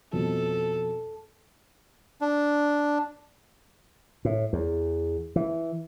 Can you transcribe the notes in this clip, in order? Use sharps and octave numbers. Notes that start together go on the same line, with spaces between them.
F2 B2 A4
D4
A2
E2
E3